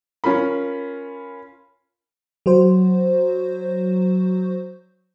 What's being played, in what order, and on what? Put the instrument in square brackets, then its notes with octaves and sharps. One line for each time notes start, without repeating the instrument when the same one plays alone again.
[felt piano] C#4 F4 A#4 B5
[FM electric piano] F#3 F#4 C5